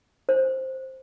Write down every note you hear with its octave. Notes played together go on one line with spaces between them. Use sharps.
C5